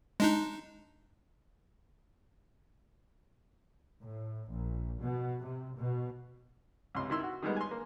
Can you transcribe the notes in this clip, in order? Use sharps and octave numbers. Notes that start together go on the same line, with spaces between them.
G#3 D4 D#4
A2
A#1
B2
C3
B2
C#2 C3 C6
D#3 E4 C6 E6
F#4
D#3 G3 G#3 B3
G#5 C6
A#3